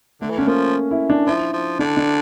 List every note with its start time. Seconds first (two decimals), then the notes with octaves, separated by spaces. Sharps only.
0.21 D3 A3
0.30 E3
0.38 D3 C#4
0.47 F3 A#3
0.91 E4
1.10 D4
1.27 F3 E4
1.53 F3
1.79 D3 D4
1.97 D4